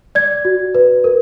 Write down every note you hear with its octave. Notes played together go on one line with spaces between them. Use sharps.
D5 G#6
F#4
B4
A#4